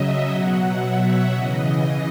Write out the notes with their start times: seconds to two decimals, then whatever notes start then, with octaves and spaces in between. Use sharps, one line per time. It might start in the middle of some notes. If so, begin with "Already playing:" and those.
Already playing: C#3 F#3 D#5 E5
0.29 B2 F#3 F#5
0.80 E5
1.30 C#3 E3 D#5